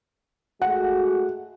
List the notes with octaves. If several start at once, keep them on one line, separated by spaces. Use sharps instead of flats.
G#3 A3 F#4 F#5